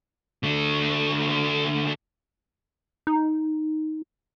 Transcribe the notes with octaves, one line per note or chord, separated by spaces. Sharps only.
D3 A3
D#4